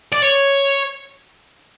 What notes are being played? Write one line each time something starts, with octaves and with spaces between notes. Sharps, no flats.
D5
C#5